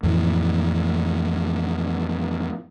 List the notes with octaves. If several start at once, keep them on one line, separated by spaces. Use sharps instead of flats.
F2 A2 E3